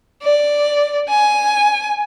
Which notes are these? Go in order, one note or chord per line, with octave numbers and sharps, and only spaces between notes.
D5
G#5